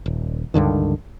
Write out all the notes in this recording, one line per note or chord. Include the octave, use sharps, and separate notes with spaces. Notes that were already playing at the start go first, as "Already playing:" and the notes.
D#1
C#2 G2 D3 D#3